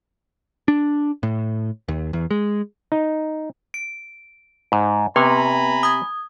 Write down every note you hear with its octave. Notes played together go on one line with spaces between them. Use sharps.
D4
A2
D#2
E2
G#3
D#4
D7
G#2
C3 B3 B4 G#5 A#5 B5
D#6 G#6